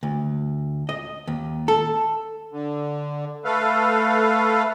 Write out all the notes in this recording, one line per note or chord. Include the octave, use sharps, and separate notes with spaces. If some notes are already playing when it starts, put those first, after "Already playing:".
D2
D#5
D#2
A4
D3
A3 A4 B4 F5